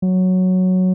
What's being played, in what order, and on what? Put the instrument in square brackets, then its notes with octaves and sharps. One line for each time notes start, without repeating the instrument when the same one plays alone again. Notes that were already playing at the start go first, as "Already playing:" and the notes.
[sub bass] F#3